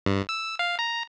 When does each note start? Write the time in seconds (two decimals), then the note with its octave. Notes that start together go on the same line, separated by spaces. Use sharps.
0.06 G2
0.29 E6
0.59 F5
0.79 A#5